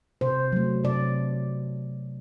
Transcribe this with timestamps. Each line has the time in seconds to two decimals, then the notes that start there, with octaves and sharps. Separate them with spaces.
0.21 C3 C5
0.52 F#3 A3
0.84 C3 D5